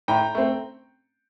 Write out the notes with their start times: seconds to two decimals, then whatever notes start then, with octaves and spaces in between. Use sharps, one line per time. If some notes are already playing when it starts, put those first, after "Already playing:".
0.08 A2 G5 A#5
0.35 A3 C4